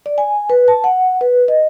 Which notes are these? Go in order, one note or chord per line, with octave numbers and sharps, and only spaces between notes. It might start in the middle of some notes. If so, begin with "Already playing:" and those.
D5
G#5
B4
A5
F#5
B4
D#5